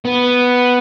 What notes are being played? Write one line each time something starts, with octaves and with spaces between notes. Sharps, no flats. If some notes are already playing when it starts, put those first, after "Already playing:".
B3